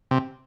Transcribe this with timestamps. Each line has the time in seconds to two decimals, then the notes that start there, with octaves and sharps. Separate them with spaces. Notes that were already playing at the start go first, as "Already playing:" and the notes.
0.11 C3